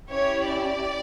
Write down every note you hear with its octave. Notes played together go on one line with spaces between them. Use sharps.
C#4 E4 G4 C#5
D5